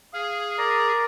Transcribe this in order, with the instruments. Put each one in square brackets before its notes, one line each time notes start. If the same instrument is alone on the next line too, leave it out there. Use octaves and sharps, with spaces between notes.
[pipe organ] G#4 [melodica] F5
[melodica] A#4 D5 A#5